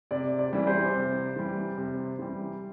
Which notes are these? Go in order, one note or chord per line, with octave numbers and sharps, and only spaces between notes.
C3 D5
D5
E3 G3
C5
C3
E3 G3
C3
E3 G3